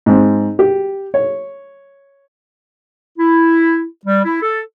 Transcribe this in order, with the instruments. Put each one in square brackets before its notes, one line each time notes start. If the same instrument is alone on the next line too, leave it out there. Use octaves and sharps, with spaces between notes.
[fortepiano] G#2 C4
G4
C#5
[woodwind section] E4
G3
E4
A4